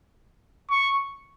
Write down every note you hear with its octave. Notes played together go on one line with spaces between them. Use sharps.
C#6